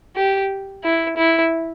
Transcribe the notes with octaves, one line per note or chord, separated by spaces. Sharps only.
G4
E4
E4